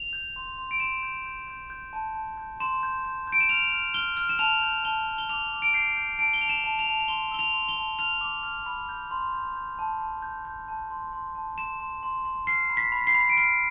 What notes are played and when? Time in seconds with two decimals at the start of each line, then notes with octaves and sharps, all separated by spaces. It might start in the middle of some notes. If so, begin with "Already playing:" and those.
Already playing: F7
0.13 G6
0.36 C6
0.58 C6
0.71 D7
0.80 C6 E7
1.03 G6
1.26 G6
1.48 G6
1.70 G6
1.93 A5
2.15 A5
2.38 G6
2.60 C6 E7
2.83 G6
3.05 G6
3.27 G6 D7
3.41 E7
3.49 F6 F7
3.72 F6
3.94 F6 G7
4.17 F6
4.29 E7
4.39 A5 F7
4.61 G6
4.84 A5 G7
5.07 A5
5.18 G7
5.29 D6 F7
5.52 D6
5.62 D7
5.74 G6 C7
5.97 G6
6.19 A5 D7
6.34 G7
6.41 A5 F7
6.49 E7
6.64 A5
6.79 F7
6.87 A5
7.00 F7
7.08 C6 G7
7.31 E6 G7
7.39 F7
7.54 C6
7.69 G7
7.77 A5
7.99 F6 F7
8.21 D6
8.43 F6
8.66 B5
8.89 G6
9.11 C6
9.33 G6
9.56 G6
9.79 A5
10.01 A5
10.22 G6
10.45 G6
10.68 A5
10.91 C6
11.13 C6
11.35 A5
11.58 C6 E7
11.80 C6
12.03 C6
12.25 C6
12.47 F6 C7
12.69 B5
12.77 B6
12.92 B5
13.01 B6
13.07 C7
13.15 B5
13.29 D7
13.37 F6 C7